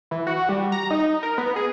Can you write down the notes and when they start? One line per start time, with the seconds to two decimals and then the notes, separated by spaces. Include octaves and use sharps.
0.11 E3
0.27 F#4
0.49 G3
0.72 A#5
0.90 D#4
1.23 A#4
1.38 B3
1.56 G#4